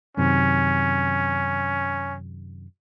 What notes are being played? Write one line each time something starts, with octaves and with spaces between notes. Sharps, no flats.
F#2 C3 D#3 C#4